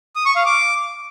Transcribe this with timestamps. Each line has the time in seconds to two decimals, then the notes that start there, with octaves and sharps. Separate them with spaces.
0.16 D#6
0.26 C#6
0.36 F5
0.46 D6